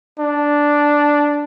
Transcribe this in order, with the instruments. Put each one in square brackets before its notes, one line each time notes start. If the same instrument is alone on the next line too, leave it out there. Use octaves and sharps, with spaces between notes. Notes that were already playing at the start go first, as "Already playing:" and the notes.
[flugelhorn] D4